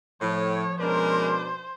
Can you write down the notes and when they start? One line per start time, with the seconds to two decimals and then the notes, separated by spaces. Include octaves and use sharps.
0.22 A2 F3 C#5
0.80 B2 G#3 C#4 D4 A#4 C5